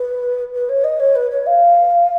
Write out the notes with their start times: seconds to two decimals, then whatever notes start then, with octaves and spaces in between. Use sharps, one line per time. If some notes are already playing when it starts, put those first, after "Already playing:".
Already playing: B4
0.53 B4
0.69 C#5
0.84 D#5
1.00 C#5
1.15 B4
1.30 C#5
1.46 F5